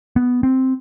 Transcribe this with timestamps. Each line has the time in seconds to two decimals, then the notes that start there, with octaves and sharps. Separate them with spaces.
0.16 B3
0.43 C4